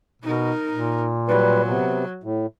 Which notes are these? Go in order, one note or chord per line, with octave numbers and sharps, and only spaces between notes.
B2 D#4 A#4
A#2
F#3 G3 B4
C3 B3
A2